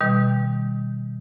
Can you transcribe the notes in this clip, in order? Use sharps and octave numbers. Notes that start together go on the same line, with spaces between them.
B2 D#3 G3